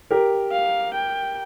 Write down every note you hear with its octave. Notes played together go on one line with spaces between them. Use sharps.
G4 A#4
F5
G5